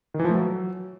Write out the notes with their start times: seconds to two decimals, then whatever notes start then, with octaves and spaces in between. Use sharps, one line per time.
0.14 D#3
0.19 E3
0.25 F3
0.30 A3
0.35 F#3